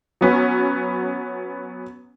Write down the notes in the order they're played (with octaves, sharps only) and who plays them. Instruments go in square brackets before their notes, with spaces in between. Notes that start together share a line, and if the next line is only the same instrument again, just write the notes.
[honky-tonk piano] F#3 B3 C#4